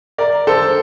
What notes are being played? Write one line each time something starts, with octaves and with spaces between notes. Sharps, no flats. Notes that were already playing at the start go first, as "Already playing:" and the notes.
A#4 D5
A4 C5